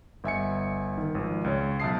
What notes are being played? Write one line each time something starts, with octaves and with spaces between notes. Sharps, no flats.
G1 E5 G#5 C#7
D#3
G#1 F3
C#2 C#5
B1 E5 A5 D#6 C7